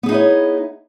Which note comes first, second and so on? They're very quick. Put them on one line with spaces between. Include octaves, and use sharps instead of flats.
B3 G#4 D#4 E4 C#5